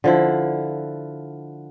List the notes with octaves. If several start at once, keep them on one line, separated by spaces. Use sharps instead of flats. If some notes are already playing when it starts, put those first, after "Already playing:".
D3 F3 E4